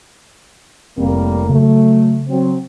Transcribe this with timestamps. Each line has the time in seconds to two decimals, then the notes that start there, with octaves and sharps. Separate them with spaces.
0.98 F1 A2 G3 A#3 C4
1.49 C#3 F#3 A3
2.29 F#3 C4